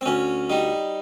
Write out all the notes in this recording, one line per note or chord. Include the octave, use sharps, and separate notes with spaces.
C4
D2 C#4
G3 D#4